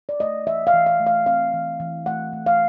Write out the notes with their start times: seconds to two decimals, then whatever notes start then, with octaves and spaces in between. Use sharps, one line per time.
0.09 D5
0.20 A3 D#5
0.47 E3 E5
0.67 F5
0.73 E3
0.87 F5
1.00 A3
1.07 F5
1.26 C4 F5
1.53 E3
1.80 E3
2.06 A3 F#5
2.33 A3
2.46 F5